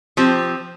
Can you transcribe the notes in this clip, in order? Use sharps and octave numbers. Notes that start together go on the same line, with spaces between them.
F3 C4 G4